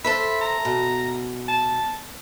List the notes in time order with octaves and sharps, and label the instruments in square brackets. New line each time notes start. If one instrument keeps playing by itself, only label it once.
[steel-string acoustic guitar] A4 C5 E5 [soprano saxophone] B5
[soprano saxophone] A#5
[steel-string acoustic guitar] B2
[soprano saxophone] A5